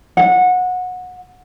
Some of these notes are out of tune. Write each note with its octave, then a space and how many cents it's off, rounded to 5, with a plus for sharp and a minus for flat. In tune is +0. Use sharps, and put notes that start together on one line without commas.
F#5 -20